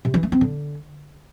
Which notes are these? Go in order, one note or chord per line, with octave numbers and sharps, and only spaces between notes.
C3
E3
A3
C4
D3